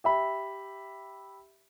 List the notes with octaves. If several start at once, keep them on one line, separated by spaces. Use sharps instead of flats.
G4 E5 B5